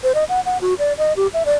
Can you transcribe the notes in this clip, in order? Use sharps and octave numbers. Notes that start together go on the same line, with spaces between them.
C5
D#5
F#5
F#5
F#4
D5
D#5
G4
E5
D5